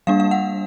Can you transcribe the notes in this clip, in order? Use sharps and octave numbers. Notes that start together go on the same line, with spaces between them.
G3 A#3 D4 F5
F5
F#5